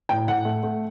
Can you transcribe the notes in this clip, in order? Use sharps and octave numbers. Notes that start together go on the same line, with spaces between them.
A2 G5
A2 F#5
A3
A3